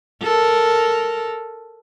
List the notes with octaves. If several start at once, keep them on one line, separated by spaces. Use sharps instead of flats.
A4 A#4